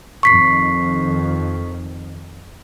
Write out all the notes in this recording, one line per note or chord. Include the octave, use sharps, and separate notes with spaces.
F2 D#3 C#6 B6 C7